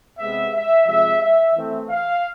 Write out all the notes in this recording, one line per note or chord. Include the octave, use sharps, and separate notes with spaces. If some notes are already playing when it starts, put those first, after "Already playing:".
C3 G#3 B3 E5
E5
C3 F3 G#3 E5
E5
E3 A3 C4
F5